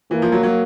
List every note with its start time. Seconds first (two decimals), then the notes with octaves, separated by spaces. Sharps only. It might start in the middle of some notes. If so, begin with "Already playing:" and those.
0.11 E3 A#3
0.22 F3
0.32 F#3
0.43 F#3